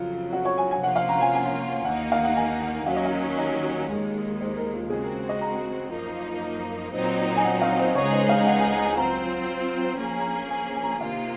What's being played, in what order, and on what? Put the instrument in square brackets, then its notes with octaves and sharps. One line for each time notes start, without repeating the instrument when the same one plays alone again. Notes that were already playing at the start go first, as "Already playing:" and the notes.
Already playing: [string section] F2 C#3 F#3 [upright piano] F4
[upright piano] F#4
C#5
G#5
G#5
[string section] C3 F3 A#3 C#4 F4 [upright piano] F#5
[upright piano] F5
A#5
G#5
G#5
[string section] D#2 D#3 A#3 D#4 [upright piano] F#5
[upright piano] F5
F#5
G#5
F#5
[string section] D#2 D#3 F#3 C#4 [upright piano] F5
[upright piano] D#5
F5
D#5
[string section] D#2 D#3 G#3
[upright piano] C5
A#4
F4
[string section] C#3 G#3 C4 F#4 [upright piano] G#4
[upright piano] A#4
D#5
A#5
[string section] F#2 F3 A#3 D#4
A#2 F#3 C4 D#4
[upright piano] G#5
F#5
F5
C5
[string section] C#2 C#3 G#3 D#4 G#4 [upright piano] C#5
[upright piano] C5
F5
F#5
G#5
A#5
G#5
[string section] F#3 C4 F4 C5 [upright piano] A#5
[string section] F3 A#3 C#4 G#4
[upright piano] A#5
G#5
A#5
G#5
G#5
A#5
G#5
[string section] C3 D#3 A#3 F4 [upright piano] F5